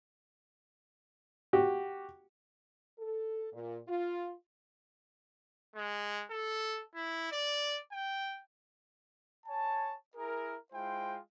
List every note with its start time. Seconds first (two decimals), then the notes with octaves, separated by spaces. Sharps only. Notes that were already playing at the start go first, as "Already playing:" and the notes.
1.53 F#4 G4
2.99 A4
3.53 A#2
3.87 F4
5.76 G#3
6.30 A4
6.95 E4
7.32 D5
7.92 G5
9.47 C#5 G#5 A5
10.16 E4 G#4 A#4
10.73 G#3 E4 F4 C5 G5